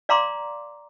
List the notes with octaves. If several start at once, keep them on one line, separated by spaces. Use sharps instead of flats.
D5 F5 A#5 C6 D6